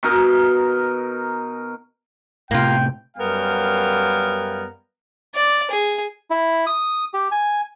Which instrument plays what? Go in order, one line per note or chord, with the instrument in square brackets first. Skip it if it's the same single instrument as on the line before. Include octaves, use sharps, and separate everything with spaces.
[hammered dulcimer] B2 D#4 A#4
[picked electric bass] A2 C3 [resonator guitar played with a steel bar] A#3 F4 [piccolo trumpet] G5
[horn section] F#2 G3 B3 A#4 F5 G5
[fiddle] D5
G#4
[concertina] E4
D#6
G4
G#5